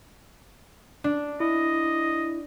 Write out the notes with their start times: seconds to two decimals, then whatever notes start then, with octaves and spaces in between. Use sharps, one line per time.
1.04 D4
1.40 E4 D#5